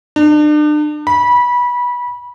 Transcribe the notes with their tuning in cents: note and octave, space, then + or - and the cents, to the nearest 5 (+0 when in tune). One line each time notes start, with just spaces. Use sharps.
D4 +40
B5 -20